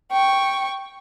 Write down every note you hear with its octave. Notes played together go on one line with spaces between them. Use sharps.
G5 C#6